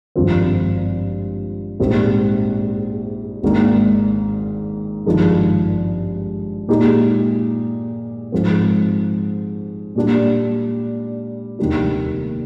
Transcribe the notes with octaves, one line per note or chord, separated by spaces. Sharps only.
G#1 G2 F3 C4 F4
A#1 G#2 G3 C4
G#1 G#2 D#3 A#3 D4
G#1 G2 F3 G#3 D#4
A#2 G#3 D#4 G4
G#2 F3 C4
A#2 G3 D4
F1 D#2 D#3 G3 D4